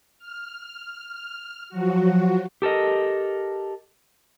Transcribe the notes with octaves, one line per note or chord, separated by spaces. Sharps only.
F6
F3 F#3 F#4
G4 A4 A#4 D#5